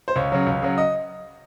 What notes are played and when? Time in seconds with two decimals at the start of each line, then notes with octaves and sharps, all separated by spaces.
0.08 C5
0.16 C#2 C#5
0.32 C#3 F#3
0.47 C#2
0.62 C#3 F#3
0.78 D#5